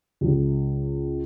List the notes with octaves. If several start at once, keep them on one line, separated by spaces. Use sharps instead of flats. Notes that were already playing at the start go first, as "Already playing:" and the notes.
C#2